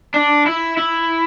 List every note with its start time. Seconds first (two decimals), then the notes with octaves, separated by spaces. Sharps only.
0.14 D4
0.46 E4
0.77 E4